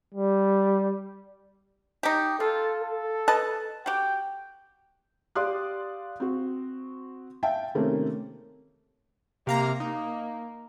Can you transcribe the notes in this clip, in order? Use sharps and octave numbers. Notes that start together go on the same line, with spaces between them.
G3
D#4 G4
F4 A4
A4
B4 D#5 A5
F#4 G4 G5
G4 D5 F5 C6 D#6 F#6
C4 F#4
E5 F5 G5 A5
C3 D#3 A3 A#3 C4 C#4
C3 A#3 F5 A#5
A#3 D#4